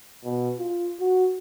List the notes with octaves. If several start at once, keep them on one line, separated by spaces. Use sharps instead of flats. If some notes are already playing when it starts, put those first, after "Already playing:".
B2
F4
F#4